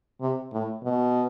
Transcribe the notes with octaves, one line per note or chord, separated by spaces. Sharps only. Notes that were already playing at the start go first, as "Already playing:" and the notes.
C3
A2
B2